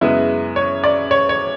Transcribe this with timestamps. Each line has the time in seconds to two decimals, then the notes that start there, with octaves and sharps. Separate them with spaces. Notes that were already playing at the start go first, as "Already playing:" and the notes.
0.01 F#2 C#3 G#3 B3 E4
0.56 C#5
0.84 D5
1.11 C#5
1.29 C#5